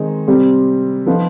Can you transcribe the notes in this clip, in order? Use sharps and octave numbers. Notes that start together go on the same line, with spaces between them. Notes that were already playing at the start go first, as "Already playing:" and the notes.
Already playing: D#3 G#3 C4 D#4
C3 G3 C4
F3 B3 D#4